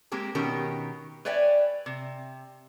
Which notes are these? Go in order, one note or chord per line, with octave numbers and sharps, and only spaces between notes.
G#3 A#3 C4 G4 G#4
B2 D#3 C#4 G4 A#4
B4 C#5 D5 E5 G5 G#5
C3